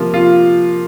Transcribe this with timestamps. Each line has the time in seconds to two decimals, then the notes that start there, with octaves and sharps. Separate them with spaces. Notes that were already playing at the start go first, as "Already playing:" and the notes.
Already playing: C3 F3 A#3 F4
0.14 F4